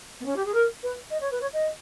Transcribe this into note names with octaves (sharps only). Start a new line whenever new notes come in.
B3
C#4
G4
G#4
A#4
B4
D#5
C#5
B4
C#5
D#5